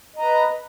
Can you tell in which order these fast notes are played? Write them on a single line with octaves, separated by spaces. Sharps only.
D#5 A#5 B4